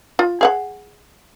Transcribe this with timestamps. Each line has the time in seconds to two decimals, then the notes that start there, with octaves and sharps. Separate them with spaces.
0.19 F4
0.41 G#4 F5 F#5